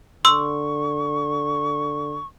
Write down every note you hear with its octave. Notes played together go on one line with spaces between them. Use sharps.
D3 C6 C#6 E6